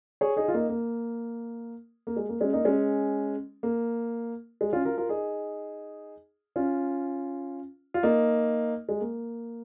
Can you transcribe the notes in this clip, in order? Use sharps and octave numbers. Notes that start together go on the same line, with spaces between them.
G#4 C#5
D#4 G#4
F4
A#3 D#4
A#3
A#3
G#3
A#3
G#3 C#4
A#3 D#4
G#3 C#4
A#3
G#3
C#4 F4
F4 A#4
F4 A#4
D#4 G#4
C#4 F4
F4
A#3 D#4
G#3
A#3